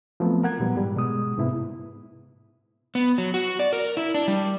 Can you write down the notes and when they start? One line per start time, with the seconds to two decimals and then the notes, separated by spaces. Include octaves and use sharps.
0.20 F3 F#3 A3 B3 C4
0.43 A#4 F#5 G#6
0.59 A#2 E3 F#3 G3 B3
0.76 G#2 G3
0.96 B2 G#3 D#6
1.38 G#2 C3 A#3 B3 E4
2.95 B3
3.18 F#3
3.34 F#4
3.59 D5
3.73 A#4
3.97 E4
4.14 D4
4.28 G3